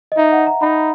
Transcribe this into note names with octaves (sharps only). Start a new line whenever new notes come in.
D#5
D#4 E5
F#5
A#5
D#4 B5